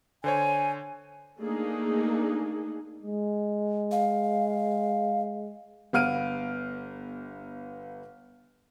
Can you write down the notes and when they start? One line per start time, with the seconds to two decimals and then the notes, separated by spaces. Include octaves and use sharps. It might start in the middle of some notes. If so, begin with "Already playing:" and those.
0.24 D3 C5 C#5 G#5
1.41 A3 A#3 D4 D#4 G#4
3.03 G#3
3.92 F5
5.93 G1 B3 F5 F6 D7 D#7